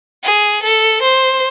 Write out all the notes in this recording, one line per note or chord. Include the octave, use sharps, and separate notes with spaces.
G#4
A4
C5